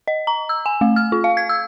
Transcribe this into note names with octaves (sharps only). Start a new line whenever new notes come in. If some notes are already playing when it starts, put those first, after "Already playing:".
D#5
A#5
E6
G#5
A3
F6
F4
F5
G#6
E6